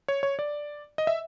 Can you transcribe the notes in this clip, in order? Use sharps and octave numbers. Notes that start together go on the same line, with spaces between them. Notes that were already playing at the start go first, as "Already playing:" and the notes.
C#5
C#5
D5
D#5
E5